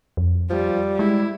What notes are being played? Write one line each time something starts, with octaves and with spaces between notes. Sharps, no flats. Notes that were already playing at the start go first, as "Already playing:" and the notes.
F2
F3 G3
G#3 E4